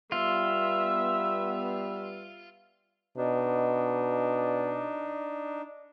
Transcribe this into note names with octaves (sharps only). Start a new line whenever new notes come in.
G3 B3 F4 E5
B2 D4 D#4